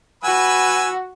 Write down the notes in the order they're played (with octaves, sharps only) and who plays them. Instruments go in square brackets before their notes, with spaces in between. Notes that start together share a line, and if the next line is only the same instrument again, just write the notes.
[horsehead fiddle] F#4 [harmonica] B4 B5 E6 [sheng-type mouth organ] G#5